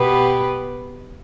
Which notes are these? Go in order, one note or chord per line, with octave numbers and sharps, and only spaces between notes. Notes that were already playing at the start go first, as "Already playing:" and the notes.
Already playing: B2 B3 G4 B4